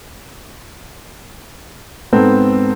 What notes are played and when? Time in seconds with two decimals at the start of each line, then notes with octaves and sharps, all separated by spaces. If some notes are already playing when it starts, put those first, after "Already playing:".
2.13 G#2 B3 C4 A4